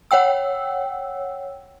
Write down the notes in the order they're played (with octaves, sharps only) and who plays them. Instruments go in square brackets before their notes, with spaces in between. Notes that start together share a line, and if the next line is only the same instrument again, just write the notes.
[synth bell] C#5 F#5 G5 E6